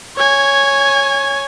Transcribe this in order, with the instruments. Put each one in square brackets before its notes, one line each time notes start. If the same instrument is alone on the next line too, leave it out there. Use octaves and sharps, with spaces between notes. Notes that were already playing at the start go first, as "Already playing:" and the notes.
[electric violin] C#5 G#5